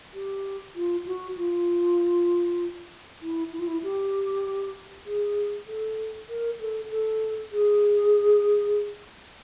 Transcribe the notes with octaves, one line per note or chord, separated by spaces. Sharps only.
G4
F4
F#4
F4
E4
E4
F4
E4
G4
G#4
A4
A#4
A4
A4
G#4